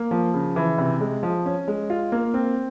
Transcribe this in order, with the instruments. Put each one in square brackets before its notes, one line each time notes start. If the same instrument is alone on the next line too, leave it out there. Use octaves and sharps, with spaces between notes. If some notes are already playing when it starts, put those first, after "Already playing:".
Already playing: [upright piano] A#3
F3
C#3
E3
C3
G#3
F3
C#4
G#3
F4
A#3
C4